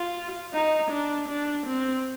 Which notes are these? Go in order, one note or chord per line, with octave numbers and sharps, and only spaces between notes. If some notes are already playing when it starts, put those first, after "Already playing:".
Already playing: F4
D#4
D4
D4
C4